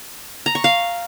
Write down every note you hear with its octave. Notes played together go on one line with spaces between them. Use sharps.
A#5
C#6
F5